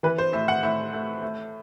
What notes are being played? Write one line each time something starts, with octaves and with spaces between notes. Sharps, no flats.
E3 B4
C5
A2 E5
F#5
A2 E5
A3
A3